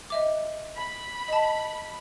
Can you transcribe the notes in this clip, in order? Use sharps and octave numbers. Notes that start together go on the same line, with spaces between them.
D#5 E5 D6
B5
D#5 A5